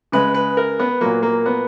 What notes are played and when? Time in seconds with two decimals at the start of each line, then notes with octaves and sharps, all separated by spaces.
0.12 C#3 G#3 B4
0.34 B4
0.57 A#4
0.79 B3
1.01 A#2 F#3 A#3
1.23 A#3
1.46 B3